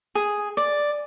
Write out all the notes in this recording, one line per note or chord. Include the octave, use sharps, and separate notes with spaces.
G#4
D5